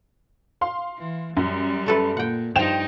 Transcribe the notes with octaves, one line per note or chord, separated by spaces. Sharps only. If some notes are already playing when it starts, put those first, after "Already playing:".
F5 C6
E3
F#2 G3
A3 A4 B4
A#2 F#5 G5
G2 F3 D#4 G5 E7 F7